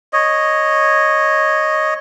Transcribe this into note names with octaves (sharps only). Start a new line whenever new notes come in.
C#5 D#5